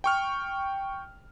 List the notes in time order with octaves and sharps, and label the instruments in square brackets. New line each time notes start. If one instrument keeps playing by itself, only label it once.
[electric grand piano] G5 C#6 F6